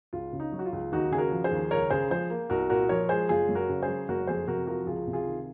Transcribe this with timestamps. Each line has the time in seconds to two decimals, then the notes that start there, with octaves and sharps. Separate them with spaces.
0.13 C#2 F4
0.33 C#3
0.40 D#4
0.52 F#3
0.59 F#4
0.66 F4
0.73 C#2
0.92 D#2 D#4 F#4
1.11 C#3 G#4
1.18 F#4 A#4
1.32 F3
1.44 G#4 C5
1.51 D#2
1.71 C#2 A#4 C#5
1.90 C#3 G#4 C5
2.11 F3 G#4 C5
2.30 A#3
2.50 C2 F#4 A#4
2.69 A#2 F#4 A#4
2.89 F3 A#4 C#5
3.09 G#3 G#4 C5
3.29 F#1 F4 G#4
3.49 F#2
3.55 F#4 A#4
3.69 C#3
3.83 G#4 C5
3.88 F#3
4.08 F#1 F#4 A#4
4.27 F2 G#4 C5
4.47 C3 F#4 A#4
4.67 F3 F#4 A#4
4.87 C#2 F4 G#4
5.07 C3
5.13 F4 G#4
5.27 D#3